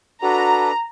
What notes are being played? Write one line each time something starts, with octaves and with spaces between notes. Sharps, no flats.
D4 F#4 A4 B4 A#5